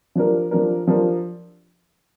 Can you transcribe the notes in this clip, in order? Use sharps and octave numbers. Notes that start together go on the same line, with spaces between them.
F3 D4 A#4
F3 D4 A#4
F3 D4 A#4